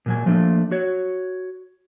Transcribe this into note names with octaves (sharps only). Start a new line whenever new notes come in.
A#2 F#3 G#5
F3 A3 A#3 D4
F#4 C#5